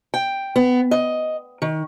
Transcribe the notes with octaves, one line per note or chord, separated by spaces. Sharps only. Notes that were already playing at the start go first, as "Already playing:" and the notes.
G5
B3
D#5
D#3